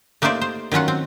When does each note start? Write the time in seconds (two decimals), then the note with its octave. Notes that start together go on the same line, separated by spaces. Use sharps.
0.22 A3 A#3 D#4 G4 C5 D5
0.41 C5
0.72 D#3 F#3 C#4 F4 F#5
0.88 C4